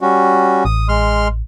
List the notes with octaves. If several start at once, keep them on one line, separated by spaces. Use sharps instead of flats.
G3 C#4 F#4
A1 D#6
G#3 C6 F6